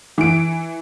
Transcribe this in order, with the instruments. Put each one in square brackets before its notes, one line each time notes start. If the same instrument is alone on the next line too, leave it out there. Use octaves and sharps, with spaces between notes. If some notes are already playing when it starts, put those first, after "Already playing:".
[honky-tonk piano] E3 D7